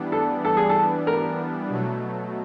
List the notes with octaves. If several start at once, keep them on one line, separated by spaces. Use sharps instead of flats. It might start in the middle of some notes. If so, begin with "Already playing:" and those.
Already playing: E3 G3 B3 D4
A4
A4
G#4
A4
A#4
B2 F#3 A3